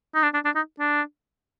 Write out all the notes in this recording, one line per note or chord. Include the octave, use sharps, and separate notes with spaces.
D#4
D4
D4
D4
D#4
D4